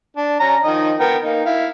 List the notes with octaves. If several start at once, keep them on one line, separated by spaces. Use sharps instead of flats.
D4
C#4 A#5
D#3 F3 D#5
B3 A#4 G5
A#3 D#4
E4 F5